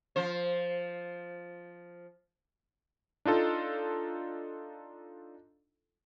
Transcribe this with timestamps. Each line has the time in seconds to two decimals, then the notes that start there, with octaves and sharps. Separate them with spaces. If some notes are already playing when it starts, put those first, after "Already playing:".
0.16 F3 C5
3.25 D4 D#4 F4 A4